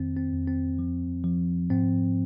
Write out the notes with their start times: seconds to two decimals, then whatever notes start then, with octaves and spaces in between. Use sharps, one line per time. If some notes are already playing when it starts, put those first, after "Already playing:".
Already playing: F2 D#3 C4
0.17 C4
0.32 F2
0.48 C4
0.79 F3
1.24 F3
1.70 G#2 C4